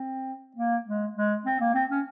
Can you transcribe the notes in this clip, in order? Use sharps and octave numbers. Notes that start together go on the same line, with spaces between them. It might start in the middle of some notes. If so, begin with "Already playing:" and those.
Already playing: C4
A#3
G#3
G#3
C4
A#3
C4
C#4